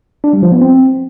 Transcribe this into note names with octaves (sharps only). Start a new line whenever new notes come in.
D4
G3
F3
B3
C4